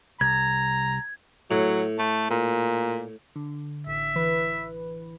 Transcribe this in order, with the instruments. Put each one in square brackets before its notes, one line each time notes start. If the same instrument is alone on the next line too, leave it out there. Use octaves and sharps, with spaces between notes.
[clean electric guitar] C2 [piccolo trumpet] A#5 [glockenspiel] G#6
[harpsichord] A2 [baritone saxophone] F#3
[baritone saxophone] A3
A#2
[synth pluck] D3
[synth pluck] A1 [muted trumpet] E5
[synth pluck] E3 B4